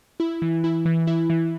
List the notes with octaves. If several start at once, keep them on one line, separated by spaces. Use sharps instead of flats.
E4
E3
E4
E3
E4
E3